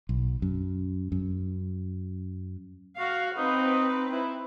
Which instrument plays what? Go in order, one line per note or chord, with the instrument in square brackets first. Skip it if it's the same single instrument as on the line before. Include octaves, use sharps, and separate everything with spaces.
[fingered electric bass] B1
F#2
F#2
[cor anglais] F#4 [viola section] F5
[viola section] C4 B4 [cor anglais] D#4
[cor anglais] E4